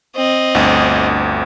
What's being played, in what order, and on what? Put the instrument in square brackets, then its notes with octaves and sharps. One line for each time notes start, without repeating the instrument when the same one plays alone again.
[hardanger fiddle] C4 D#5
[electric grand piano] G1 D2